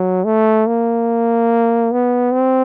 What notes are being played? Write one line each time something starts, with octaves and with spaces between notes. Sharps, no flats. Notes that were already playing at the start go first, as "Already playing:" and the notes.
Already playing: F#3
A3
A#3
B3
C4